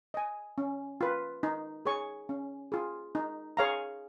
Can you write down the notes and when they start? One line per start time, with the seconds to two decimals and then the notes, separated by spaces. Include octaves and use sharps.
0.14 D#5 G#5
0.58 C#4
1.01 F4 B4
1.43 D#4
1.86 G#4 C#5 G#5 C#6
2.29 C#4
2.72 F4 G#4
3.15 D#4
3.57 G#4 C#5 F5 A#5